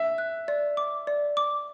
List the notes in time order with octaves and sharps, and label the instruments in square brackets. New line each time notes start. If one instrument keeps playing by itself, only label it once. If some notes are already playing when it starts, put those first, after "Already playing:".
Already playing: [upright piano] E5
[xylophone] F#6
D5
D6
D5
D6